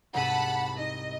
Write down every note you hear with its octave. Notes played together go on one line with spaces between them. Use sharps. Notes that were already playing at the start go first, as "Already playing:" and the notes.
C2 G#2 F#5 A5 B5 D#7
D#4 D#5